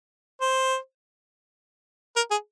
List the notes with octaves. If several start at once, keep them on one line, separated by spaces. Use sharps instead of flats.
C5
A#4
G#4